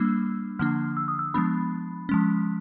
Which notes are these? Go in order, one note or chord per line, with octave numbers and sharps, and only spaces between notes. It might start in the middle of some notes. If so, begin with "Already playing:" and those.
Already playing: G3 A#3 D4 E6
D3 F3 A#3 D4 F6
E6
D#6
E6
F3 G#3 B3 D4 B5
F3 G#3 C#4